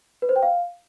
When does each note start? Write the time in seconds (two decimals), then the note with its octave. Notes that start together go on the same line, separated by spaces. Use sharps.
0.22 B4
0.29 C5
0.36 G5
0.43 F5